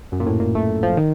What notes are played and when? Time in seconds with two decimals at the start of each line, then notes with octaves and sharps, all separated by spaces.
0.12 F#2
0.20 A#2
0.26 A2
0.40 A#2
0.55 A3
0.83 F3
0.97 D#3